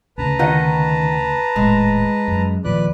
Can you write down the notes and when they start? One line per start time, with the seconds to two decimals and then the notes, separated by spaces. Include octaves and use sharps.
0.18 D2 C#3 B4 A5 A#5
0.39 D#3 D#5 F#5
1.56 D#1 A2 G#3
2.28 F#2
2.64 D#2 A#2 F3 B4 D5 F#6